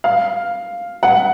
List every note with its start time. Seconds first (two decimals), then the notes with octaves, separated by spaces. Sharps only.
0.04 F5
1.03 F#5